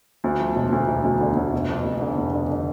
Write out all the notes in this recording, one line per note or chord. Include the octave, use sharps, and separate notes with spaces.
D2
F3
E1
D2
E1
D2
D3
D2
F1
F2
F1
D3
F1
D3
D3